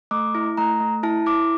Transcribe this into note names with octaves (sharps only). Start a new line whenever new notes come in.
A3 D6
E4
A3 A#5
A3
E4 A5
E4 D6